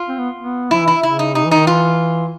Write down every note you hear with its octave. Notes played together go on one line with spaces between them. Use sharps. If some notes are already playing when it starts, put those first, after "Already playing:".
Already playing: F4
C4
B3
B3
F3 E4
E3
E4
C#3 E4
D#4
C3 D#4
E3
D#4
D#3
E3 F4